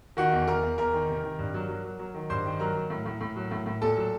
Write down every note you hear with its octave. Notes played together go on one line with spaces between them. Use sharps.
D#3 F#4 F#5
E2
E2 A#4 A#5
E2
E2 A#4 A#5
D#3
C3
D#3
G2
F#3
F#3
F#3
F#3
D#3
G2 C5 C6
D#3
F#3 A#4 A#5
F#3
A2
A2
A2
F#3
A2
A2
A#2 A4 A5
F#3